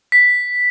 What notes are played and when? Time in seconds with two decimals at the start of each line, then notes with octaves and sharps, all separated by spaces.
0.12 B6